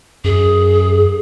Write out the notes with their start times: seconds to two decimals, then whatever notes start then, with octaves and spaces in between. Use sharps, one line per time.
0.24 F#2 G#4